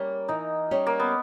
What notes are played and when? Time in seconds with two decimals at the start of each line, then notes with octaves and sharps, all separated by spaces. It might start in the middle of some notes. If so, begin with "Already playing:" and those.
Already playing: G3 A#3 C#4 G4 C#5
0.28 E3 D#4
0.71 G3 C#4 G4 C#5
0.86 A#3
0.99 B3